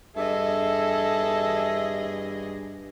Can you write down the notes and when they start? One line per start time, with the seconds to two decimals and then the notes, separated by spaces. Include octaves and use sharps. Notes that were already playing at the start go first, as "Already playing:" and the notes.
0.16 G2 G#4 A4 D#5 E5